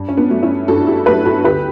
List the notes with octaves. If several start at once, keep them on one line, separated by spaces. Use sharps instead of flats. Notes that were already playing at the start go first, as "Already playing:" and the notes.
Already playing: G2
C#4
B3 D4
F#3 A3
C#4 E4
G2 F#4 A4
E4 G4
F#3 A3 G4 B4
F#4 A4
D2 G4 B4